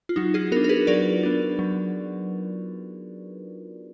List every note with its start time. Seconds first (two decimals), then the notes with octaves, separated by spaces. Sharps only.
0.09 F4
0.16 F#3 D#4 F#4
0.34 F4 G#4
0.52 B3 F#4 A#4
0.56 D4
0.64 A#4
0.69 G#4 B4
0.87 F#3 A#4 D5
1.23 B3 D4
1.59 F#3